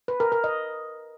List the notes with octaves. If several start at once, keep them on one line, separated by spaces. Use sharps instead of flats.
B4
A#4
A#4
D#5